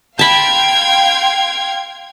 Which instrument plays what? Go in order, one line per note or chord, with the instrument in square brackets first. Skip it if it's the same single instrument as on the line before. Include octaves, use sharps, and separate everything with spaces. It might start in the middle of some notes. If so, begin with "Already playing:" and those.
[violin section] F5 G5 C6 [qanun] A5 B5 [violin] G#6